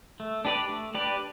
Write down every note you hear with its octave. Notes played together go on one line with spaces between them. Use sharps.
A3
D4 G4 B4 D5
A3
D4 G4 B4 D5